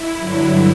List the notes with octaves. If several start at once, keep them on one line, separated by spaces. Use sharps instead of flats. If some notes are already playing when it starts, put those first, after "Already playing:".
Already playing: E4
G2 D3 F#3